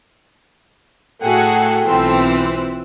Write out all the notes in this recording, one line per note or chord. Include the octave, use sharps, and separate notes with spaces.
A2 A3 F#4 G#4 A4 F#5 G5
B1 E3 C4 F4 E6